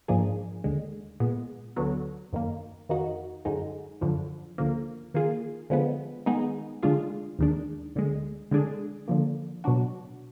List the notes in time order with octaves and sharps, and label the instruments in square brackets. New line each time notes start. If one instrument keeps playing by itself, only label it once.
[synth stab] G#2 F3 A#3 D4 G#4
D#2 D3 G#3
A#2 G#3 B3
D2 D3 F#3 B3
F#2 D#3 A#3
F2 D#3 A#3 D#4 F#4
F#2 D3 G#3 D#4
F#2 D3 F3
D2 D3 F3 A#3
D#3 A#3 F4 G#4
D3 F3 G#3 B3
D#3 G#3 B3 D#4 G#4
D3 G#3 D4 F4 G#4
D#2 D#3 G#3 D4
D2 D3 G#3
D3 G#3 D4 G#4
D3 F3 A#3
B2 F#3 D4 F#4